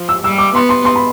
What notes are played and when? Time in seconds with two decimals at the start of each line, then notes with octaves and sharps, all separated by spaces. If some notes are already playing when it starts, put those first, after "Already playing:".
Already playing: F3
0.09 E6
0.24 G3 E6
0.38 D6
0.54 B3 C6
0.69 C6
0.85 C6
0.96 B5